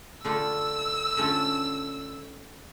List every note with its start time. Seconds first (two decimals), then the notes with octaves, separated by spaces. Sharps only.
0.25 D3 A3 D4 F4 E6
1.17 D3 A3 C#4 F4